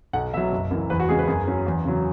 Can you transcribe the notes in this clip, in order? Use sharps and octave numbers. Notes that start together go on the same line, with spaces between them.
B1 F#5
B2 F#3 E5
F#1
F#2 E3
E2 B4
F#4
C#3 G#3 G#4
B4
F#2 G#4
F#3 C#4
E2
C#3 F#3